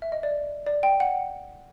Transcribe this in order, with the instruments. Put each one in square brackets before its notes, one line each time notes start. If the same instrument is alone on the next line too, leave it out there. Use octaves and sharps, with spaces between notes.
[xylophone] E5
D#5
D5
D5
G5
F#5